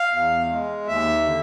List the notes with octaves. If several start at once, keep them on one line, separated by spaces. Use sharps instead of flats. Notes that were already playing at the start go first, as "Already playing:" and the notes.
Already playing: F5
E2
G#3
D#2 E5
D3